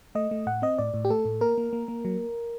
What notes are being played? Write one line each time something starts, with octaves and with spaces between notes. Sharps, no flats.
A3 D#5
A3
A2 F#5
C4 D#5
A2 D5
A2
G4
A3 A4
A2
A#3 A#4
A#3
A#3
A#3
F#3